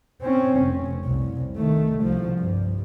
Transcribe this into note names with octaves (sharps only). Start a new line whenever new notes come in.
C4 C#4
F1
C2
D#3 A3
C2 F3
G2